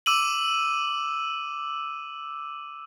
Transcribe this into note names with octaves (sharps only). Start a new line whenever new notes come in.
D6 E6 D#7 F#7